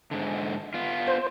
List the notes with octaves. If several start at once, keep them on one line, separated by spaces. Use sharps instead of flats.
G#2 D3
B3 F4
C5